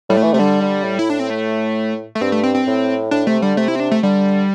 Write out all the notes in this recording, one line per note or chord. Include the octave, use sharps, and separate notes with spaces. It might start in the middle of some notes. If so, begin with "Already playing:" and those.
A2 G3
A3
E3
C3 A3
D3 G3
D3
A2
E4
D4
C4
A3
A3
G2 C4
A3
C4
C4
A2
A2 D4
C3 A3
D3 G3
C3 A3
E4
C4
D4
A3
D3 G3